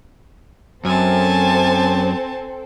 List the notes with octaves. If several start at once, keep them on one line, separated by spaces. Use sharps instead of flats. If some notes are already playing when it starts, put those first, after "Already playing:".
F#2 C4 A4 G#5 A5